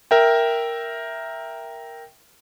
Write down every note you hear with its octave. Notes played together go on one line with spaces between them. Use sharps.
A#4 E5 G5